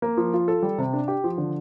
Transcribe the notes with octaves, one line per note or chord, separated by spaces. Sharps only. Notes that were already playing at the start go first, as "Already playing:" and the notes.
A#3
F3
F4
A4
G3
C3
D4
G4
F3
D3